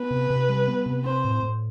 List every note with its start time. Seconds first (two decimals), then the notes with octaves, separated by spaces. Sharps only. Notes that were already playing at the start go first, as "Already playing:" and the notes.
Already playing: B3 B4
0.11 C3
0.30 C3
0.49 G3
0.68 B3
0.86 C3
1.05 C4 C5
1.24 A2
1.43 A2